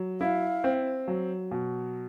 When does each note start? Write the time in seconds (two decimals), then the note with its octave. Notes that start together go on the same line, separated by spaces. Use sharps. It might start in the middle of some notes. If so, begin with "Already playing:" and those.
Already playing: F#3
0.20 E4 F5
0.64 C4
1.08 F#3
1.51 B2